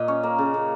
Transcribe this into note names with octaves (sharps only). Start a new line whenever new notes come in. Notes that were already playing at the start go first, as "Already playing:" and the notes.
Already playing: A#2 D#5
C#4 C#5
A#3
C#3
C#3